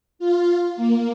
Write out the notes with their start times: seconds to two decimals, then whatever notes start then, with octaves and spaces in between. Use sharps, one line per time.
0.19 F4
0.76 A#3